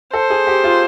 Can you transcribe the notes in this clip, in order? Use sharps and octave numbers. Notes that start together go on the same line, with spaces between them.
A4 C5
G#4
G4
F4